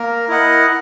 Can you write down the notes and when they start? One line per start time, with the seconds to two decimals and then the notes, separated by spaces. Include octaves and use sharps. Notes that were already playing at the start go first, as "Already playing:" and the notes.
Already playing: A#3 A#4
0.28 E4 A#4 D#5 F#5